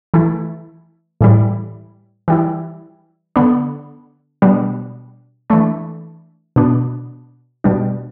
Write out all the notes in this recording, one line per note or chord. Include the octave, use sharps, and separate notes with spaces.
E3 A3 E4
A2 E3 G3 E4
E3 G3 E4
D3 B3 D4
B2 G3 B3 D4
E3 A3 D4
B2 B3 D4
B2 G3 D4